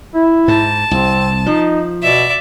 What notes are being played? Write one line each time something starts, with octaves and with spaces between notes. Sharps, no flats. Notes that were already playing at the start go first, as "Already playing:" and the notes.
E4
G#2 A5
C2 C4
F3 D#4
B2 D5 E5